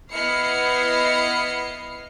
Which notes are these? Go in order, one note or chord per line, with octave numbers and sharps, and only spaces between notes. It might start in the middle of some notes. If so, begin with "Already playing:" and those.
B3 E4 D#5 F6 C7 C#7